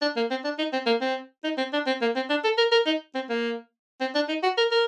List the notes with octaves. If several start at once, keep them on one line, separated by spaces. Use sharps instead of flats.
D4
A#3
C4
D4
D#4
C4
A#3
C4
D#4
C4
D4
C4
A#3
C4
D4
A4
A#4
A#4
D#4
C4
A#3
C4
D4
D#4
F#4
A#4
A#4